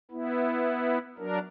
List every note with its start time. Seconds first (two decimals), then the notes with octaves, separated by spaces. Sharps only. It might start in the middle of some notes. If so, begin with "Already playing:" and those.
0.11 B3 E4
1.18 F#3 D4 A#4